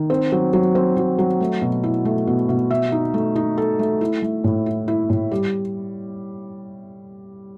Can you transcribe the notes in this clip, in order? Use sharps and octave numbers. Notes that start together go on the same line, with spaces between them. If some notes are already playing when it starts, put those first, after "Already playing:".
Already playing: D#3
C4
F#3
F#3
C4
F#3
F#3
A3
B2
E4
A3
B2
B2
E5
D#4
A3
D#4
A4
A3
E4
A3
A2
E4
E4
A2
G3